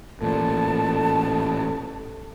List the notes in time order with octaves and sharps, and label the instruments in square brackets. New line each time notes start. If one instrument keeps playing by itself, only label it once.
[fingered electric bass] A1 A#2 [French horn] A4 [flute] A5